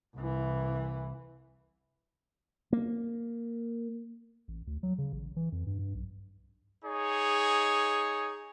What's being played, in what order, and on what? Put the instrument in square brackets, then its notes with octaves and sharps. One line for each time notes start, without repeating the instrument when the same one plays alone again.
[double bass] C2 E3
[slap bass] A#3
[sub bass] A1
D2
F#3
C#3
A1
E3
F2
G2
G2
B1
[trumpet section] D#4 G#4 C#5